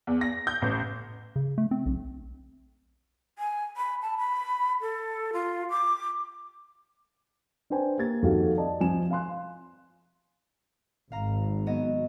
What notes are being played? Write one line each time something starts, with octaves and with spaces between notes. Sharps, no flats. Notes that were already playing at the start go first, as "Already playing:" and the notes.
E2
A#6
G6
A1
C#3
A3
C4
B1
G#5
B5
A5
B5
A4
F4
D6
D4 B4 C5 G5 G#5
A#3 G4 G#6 A6
F2 D#3 F#4 G4 A4 F5
D5 D#5 A5
F3 C4 G#5 E7
F5 G#5 C6 F#6
G#1 F5 A#5
F#3 B3 D#5